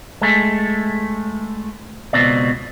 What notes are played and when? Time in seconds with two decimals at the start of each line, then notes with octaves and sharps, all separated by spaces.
0.21 G#3 A3
2.13 C#2 B2 C4 D5